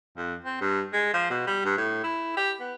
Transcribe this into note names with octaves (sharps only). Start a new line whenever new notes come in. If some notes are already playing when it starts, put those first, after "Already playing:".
F2
C4
G2
G#3
F3
B2
G3
G2
A2
E4
G4
B3